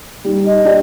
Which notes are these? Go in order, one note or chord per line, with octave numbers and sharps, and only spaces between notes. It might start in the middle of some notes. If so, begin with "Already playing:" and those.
G3 D#4
D#5
D4 G4 D5